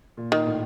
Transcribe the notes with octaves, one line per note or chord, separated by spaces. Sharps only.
A#2
D#3
A2